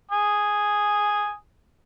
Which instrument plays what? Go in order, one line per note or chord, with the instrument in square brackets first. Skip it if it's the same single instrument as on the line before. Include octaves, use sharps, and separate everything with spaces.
[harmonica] G#5 D#6